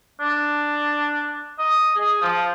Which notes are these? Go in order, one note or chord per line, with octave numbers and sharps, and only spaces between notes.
D4
D#5
G#4
F3